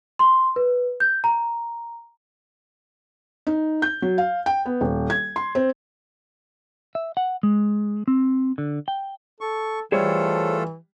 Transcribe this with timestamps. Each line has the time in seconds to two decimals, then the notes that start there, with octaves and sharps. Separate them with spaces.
0.19 C6
0.56 B4
1.00 G6
1.24 A#5
3.47 D#4
3.82 G6
4.02 F#3
4.18 F5
4.46 G5
4.66 B3
4.81 D#1
5.10 G#6
5.36 C6
5.55 C4
6.95 E5
7.17 F#5
7.43 G#3
8.08 C4
8.58 D3
8.88 G5
9.41 A4 C#6
9.92 E3 G3 A3 F4 G#4 A4 C5 C#5